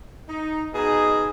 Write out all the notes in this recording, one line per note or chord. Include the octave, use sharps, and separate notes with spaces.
D#4
B2 D#4 G#4